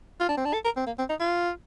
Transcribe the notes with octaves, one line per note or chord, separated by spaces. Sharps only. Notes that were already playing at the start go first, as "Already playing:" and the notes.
F4
D4
C4
D4
A4
A#4
C4
A#3
C4
D#4
F4